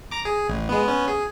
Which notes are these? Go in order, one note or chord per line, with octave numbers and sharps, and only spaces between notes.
A#5 D6
G#4
A1
G#3 B3
B3 C#4
G#4